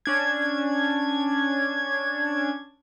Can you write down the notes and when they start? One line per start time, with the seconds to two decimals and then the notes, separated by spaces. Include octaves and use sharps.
0.06 C#4 D4 G#6